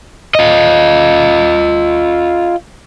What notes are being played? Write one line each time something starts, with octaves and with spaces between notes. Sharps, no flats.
F4 D#5